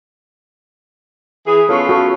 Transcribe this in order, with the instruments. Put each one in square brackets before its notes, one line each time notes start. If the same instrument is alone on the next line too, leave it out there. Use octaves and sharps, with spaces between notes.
[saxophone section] E3 G#4
[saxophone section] B3 C#4 F4 [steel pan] A4 C#6
[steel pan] F#4 A4 C#6